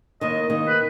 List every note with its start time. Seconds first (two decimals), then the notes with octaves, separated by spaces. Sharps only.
0.21 D#2 D#3 D#5
0.50 D#2 D#3
0.68 B4